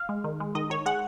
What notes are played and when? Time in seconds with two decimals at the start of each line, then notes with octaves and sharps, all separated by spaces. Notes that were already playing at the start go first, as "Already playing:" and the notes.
Already playing: F5
0.09 G#3
0.24 D#3
0.40 G#3
0.55 D#3 D#5
0.70 D#3 C#5
0.86 G#3 F#5